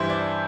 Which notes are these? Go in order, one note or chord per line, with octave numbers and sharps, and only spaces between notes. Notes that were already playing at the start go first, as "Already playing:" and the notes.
Already playing: G2 E3 G3 E4 C5
D5